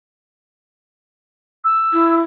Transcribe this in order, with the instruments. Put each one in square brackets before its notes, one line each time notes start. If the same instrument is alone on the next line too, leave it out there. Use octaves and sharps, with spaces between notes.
[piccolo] E6
[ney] E4